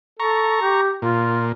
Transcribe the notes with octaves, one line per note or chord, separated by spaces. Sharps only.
A4 A#5 C#6
G4
A#2 F4